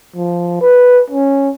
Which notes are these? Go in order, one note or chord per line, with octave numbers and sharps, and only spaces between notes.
F3
B4
C#4